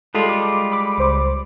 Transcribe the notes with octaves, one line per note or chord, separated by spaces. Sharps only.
G3 G#3 F4 A4
D6
B5 D6
C#2 C5 D6